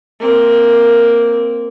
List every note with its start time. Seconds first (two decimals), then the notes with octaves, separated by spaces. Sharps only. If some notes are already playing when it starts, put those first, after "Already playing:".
0.19 A#3 C4